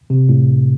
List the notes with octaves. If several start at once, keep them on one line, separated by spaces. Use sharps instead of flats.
C3
A2